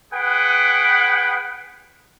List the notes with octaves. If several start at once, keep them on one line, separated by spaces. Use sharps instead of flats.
G#4 B4 F#5 G5